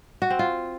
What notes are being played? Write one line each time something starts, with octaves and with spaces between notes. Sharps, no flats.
F#4
C4
F4